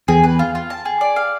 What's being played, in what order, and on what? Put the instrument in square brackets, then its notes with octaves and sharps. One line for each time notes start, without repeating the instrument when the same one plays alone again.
[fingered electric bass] E2 [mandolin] G#4
[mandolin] B4
F4
F4
A5
G#4
D5
F5